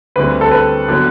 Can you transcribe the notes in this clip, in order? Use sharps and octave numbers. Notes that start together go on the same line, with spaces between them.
D2 D3 G3 C4 B4
A4
B4
D3 F#3 B3